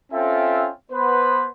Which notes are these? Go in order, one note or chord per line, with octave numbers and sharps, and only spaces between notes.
C4 C#4 F4 A4 E5 G5
B3 B4 C5